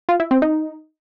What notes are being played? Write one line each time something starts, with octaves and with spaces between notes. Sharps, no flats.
F4
E4
C4
D#4